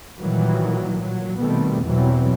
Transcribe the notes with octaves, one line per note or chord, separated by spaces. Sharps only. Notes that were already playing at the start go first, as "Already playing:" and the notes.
A#2 D#3 E3 F#3 G3
A#2 F#3
B2 D#3 G3 A3 B3 C4
E2 B2 E3 F#3 G3 C4